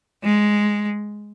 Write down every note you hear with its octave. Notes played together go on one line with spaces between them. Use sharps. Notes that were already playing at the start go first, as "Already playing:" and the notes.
G#3